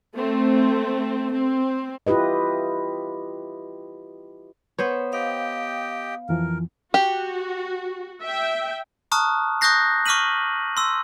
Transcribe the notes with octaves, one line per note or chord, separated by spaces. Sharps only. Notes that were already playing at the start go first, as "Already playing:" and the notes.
A3 C4
C4
E4 F4 G4 B4 D#5
B3 C5 C#5
G4 D#5 F5 G5
F2 E3 F3 A#4
F#4 G4
E5 G5
A5 A#5 C#6 D#6 F6 F#6
C#6 D#6 F#6 G6 A#6 C7
C#6 D6 F6 B6 D#7 F#7
C6 E6